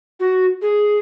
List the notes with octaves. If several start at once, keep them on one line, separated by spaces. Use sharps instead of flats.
F#4
G#4